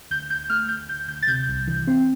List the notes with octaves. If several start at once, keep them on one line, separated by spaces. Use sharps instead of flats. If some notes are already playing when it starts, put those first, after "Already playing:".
D2 G6
D2 G6
A3 F6
D2 G6
D2 G6
D2 G6
A6
C3 G6
C2
E3
C4